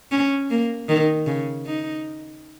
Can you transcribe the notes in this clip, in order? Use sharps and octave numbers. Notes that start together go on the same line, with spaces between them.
C#4
A#3
D#3
C#3
D#4